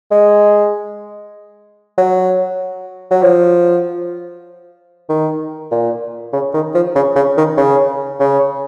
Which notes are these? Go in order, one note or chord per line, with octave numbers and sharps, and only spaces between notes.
G#3
F#3
F#3
F3
D#3
A#2
C#3
D#3
F3
C#3
C#3
D#3
C#3
C#3